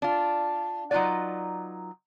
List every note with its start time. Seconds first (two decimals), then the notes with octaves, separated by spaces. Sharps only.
0.02 D4 F4
0.91 F#3 D#4 F4 F#4 B4 D5